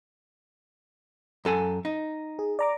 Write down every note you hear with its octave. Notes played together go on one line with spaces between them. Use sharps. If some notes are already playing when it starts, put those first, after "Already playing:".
F#2 A4 G#5
D#4
G#4
D5 A#5 D6